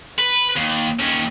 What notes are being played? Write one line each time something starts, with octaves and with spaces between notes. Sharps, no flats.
B4
D#2
D#2 C#4